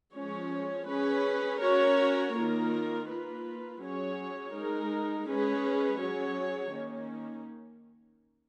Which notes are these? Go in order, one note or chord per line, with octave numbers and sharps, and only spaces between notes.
F3 G#3 C#4 G#4 C#5
C#4 G#4 B4
C#4 F#4 A#4 C#5
D#3 A#3 F4 A#4
A#3 F4 B4
F#3 C#4 G#4 C#5
G#3 D#4 A#4
G#3 C#4 G#4 B4
F#3 C#4 G#4 C#5
D#3 A#3 C#4